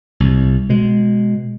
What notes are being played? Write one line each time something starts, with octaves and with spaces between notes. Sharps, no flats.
C2
B2 G#3